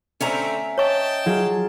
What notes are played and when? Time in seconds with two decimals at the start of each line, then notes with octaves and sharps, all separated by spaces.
0.21 D3 A3 C4 C#4 E5 A#5
0.78 C#5 D#5 G5 A5 C#6
1.26 F#3 F4 G#4